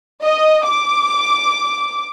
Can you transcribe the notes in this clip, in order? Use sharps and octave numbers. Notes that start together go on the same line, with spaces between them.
D#5
D6